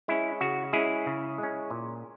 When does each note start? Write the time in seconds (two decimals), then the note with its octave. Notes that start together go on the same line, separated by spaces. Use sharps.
0.08 G#3 C#4 E4
0.41 C#3 F#4
0.73 G#3 C#4 E4 G#4
1.07 C#3
1.38 G#3 C#4
1.70 A#2